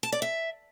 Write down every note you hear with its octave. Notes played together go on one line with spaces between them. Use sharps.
A5
D5
E5